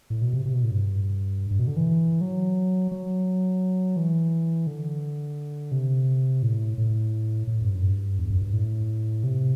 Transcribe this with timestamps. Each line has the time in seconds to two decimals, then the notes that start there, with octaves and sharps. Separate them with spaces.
0.10 A2
0.22 B2
0.33 C3
0.45 C3
0.54 B2
0.63 A2
0.71 G2
1.51 G2
1.59 B2
1.68 D3
1.77 E3
2.21 F#3
2.91 F#3
3.96 E3
4.67 D3
5.72 C3
6.42 A2
6.78 A2
7.47 A2
7.62 G2
7.75 F#2
7.88 G2
8.19 E2
8.30 F#2
8.42 G2
8.53 A2
9.23 C3